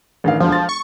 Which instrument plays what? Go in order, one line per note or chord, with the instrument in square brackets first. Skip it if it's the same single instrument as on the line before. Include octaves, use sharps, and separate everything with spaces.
[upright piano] A1 D#3 F5
[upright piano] E1 D2 [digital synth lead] F3
[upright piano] A6
[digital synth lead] C#6